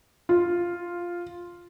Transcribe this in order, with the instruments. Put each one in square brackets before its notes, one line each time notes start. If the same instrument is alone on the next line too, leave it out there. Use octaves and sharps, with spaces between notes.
[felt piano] F4